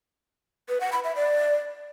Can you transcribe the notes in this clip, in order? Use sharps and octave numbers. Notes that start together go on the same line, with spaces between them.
B4
F#5
B5
E5
D5